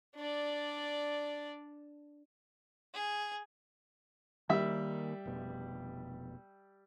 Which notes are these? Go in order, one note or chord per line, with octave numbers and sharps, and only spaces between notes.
D4 D5
G#4
D#3 G3 A#3 E5
F1 B2